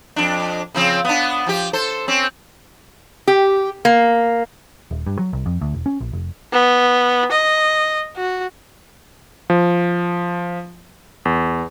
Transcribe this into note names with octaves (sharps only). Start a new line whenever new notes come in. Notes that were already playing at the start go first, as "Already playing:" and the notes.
F2 D4
C#3 F3 C4
B3 D4
F3 G4
A4 C5
C4 C#4
G4
A#3
D#1
G2
F#3
C2
F2
D2
E1
C#4
A#1
F1
B3
D#5
F#4
F3
E2